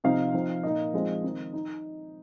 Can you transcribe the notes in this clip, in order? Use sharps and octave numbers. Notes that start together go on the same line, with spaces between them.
C3 F3 C4 D#4 F5
F3 C4 D#4
A#2 A#3 D#4 D#5
F3 G#3 C4 D#4
D#3 C4 D#4
D#4